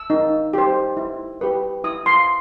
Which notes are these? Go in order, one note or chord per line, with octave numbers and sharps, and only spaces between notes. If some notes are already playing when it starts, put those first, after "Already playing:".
Already playing: E6
D#4
G4 C5
E4
G4 B4
E4 D#6
C6